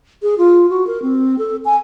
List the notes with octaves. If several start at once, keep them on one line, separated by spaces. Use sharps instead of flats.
G#4
F4
F#4
A#4
C4
A4
G#5